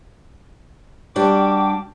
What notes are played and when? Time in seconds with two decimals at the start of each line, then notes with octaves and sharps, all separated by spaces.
1.16 G3 D4 F#4 G5 D6